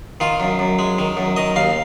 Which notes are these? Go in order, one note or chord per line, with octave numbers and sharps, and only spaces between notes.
D#3 F4
F#2
F#2
G#3
D#3
F#2
D#3 D#5
D#2 F5